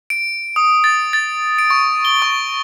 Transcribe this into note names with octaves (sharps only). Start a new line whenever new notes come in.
D7
D#6
A6
A6
D7
C#6
G7
C#6